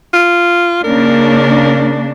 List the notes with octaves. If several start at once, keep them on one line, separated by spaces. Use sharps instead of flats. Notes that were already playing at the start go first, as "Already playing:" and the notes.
F4
C#3 A#3 D4 A#4